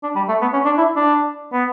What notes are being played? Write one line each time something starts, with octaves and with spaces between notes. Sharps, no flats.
D4
G3
A3
B3
C#4
D4
E4
D4
B3